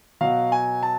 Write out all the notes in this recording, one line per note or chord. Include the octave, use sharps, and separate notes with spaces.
B2 F#3 F5
G#5
A5